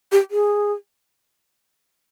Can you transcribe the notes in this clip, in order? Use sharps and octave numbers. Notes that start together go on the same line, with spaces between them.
G4
G#4